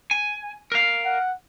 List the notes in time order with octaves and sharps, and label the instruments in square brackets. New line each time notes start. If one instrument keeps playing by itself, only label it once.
[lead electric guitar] G#5
A#4 F5
[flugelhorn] F#5